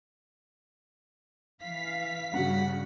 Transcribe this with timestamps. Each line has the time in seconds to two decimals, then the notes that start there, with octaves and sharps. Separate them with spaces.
1.62 E3 F5 B6
2.34 G2 C#3 G3 F#4 F#5